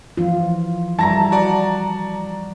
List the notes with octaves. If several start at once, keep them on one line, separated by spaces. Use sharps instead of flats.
E3 F3 F4
G3 E4 A5 A#5 A#6
F#4 D5